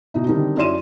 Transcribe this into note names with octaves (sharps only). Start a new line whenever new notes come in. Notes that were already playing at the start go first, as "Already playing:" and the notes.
B2 D#4 E4
D3 D#3 G3 C4 D#4
F#2 E4 D5 C6 D#7 E7